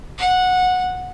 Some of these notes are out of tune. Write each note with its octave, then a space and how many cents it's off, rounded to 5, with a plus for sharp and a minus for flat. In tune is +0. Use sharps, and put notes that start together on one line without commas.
F#5 -15